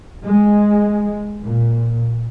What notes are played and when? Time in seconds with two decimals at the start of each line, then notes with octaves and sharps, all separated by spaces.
0.24 G#3
1.45 A#2